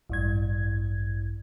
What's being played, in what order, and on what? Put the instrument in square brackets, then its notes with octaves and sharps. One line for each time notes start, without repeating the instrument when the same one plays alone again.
[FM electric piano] A1 G2 G#6